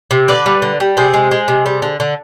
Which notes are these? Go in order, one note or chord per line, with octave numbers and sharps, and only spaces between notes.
C3
D3 B4 D5
G3
D3
G3
C3 G#4 C5
G#3
G#3
C3
G3
D3
D3